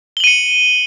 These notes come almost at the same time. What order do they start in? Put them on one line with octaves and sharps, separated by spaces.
G7 F#7 D#7 C#7